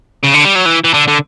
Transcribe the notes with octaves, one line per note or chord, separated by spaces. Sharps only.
C#3
D3
G3
F#3
E3
E3
D3
D3